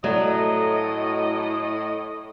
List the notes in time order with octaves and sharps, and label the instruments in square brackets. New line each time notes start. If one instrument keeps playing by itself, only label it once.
[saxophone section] A2 D#5 [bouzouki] F#3 [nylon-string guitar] A3